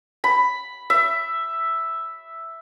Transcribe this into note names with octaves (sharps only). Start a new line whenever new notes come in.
B5
E5